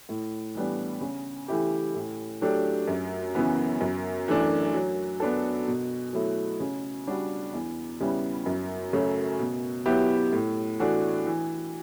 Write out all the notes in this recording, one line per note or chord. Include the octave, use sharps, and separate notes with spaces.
A2
E3 G3 B3 D4
C#3
E3 A3 E4 G4
A2
F#3 A3 D4 G4
F#2
C#3 E3 B3
F#2
E3 A3 D4
F#3
B3 D4 A4
B2
F#3 A3 E4
C#3
G3 D4 F#4
E2
C#3 G3 B3 E4
F#2
C#3 F#3 A3
B2
F#3 B3 E4 G4
A2
E3 A3 D4 F#4
E3